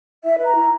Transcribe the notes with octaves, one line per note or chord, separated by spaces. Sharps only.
E4 E5
B4
A#5
E4